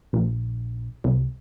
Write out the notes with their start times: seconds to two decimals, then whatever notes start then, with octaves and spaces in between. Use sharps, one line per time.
0.13 A#1
1.04 C2